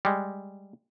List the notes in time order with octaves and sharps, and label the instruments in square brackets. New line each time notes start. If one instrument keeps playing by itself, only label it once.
[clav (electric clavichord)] G3 G#3